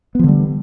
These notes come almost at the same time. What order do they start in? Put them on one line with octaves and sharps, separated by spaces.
B3 F3 D3 G3